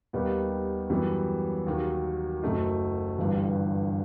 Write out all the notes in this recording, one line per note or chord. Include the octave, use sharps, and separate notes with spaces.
D#2 D#3 G3 B3 D#4
F#2 E3 G3 B3
D#2 D#3 F#3
F#1 F#2 F#3 A3 D#4
G1 G2 E3